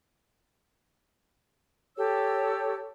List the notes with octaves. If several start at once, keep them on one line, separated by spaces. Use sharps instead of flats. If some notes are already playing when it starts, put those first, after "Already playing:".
G4 A4 C#5 E6